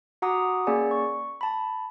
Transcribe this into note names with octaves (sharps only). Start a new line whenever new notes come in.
F#4 F#5 A#5 D6 D#6
A#3 C#4 G#4 D5 G#5
C#6
A5 B5